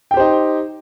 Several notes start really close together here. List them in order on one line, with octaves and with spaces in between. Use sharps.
G5 G4 C5 D#4